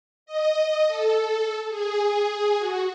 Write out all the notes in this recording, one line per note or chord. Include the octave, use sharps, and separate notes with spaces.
D#5
A4
G#4
F#4